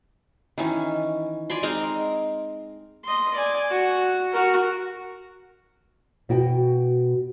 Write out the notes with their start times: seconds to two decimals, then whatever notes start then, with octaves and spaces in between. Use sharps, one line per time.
0.58 D#3 E3 C#4
1.50 D5 G#5 B5 C6
1.63 G#3 C4 D#4 A#4
3.04 D#5 C6
3.34 D5 G#5
3.70 F#4
4.32 F#4 A#4
6.29 B2 F#4 G5